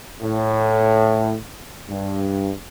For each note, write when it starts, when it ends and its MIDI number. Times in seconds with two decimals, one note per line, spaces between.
0.22 1.35 45
1.90 2.51 43